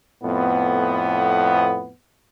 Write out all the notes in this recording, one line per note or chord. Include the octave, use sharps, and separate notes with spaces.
F2 A2 B3